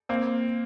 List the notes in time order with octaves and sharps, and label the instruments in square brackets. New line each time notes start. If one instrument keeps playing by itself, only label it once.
[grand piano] A#3 C4